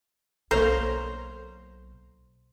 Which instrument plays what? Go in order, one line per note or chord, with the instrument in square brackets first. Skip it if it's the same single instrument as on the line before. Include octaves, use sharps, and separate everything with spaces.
[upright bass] B1 [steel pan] A#3 C#5 A#5 [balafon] A4 [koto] C5